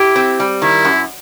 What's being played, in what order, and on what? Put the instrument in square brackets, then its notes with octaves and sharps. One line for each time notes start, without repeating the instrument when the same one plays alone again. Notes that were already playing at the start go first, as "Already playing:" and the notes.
Already playing: [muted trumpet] E4 [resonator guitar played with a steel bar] G4
[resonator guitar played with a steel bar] C4
G3
[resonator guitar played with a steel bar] D#3 [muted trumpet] E4
[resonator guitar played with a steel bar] F#2